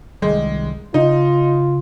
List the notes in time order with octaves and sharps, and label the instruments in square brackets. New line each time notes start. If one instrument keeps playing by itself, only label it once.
[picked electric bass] C2 D#3 G3 [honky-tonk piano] G#3
[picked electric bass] C#3 [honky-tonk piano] D#4 [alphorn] F4